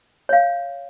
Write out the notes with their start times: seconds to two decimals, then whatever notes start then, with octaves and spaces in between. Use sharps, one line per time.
0.29 C#5 F5